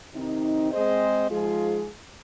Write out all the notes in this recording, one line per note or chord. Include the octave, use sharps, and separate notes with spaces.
C3 D#3 C4 D#4
G#3 C4 G#4 C5 D#5
G#2 F3 G#3 F4 G#4